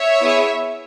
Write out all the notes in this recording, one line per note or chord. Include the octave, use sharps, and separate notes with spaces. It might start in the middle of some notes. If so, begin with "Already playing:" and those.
Already playing: C#5 E5
B3 E4 G#4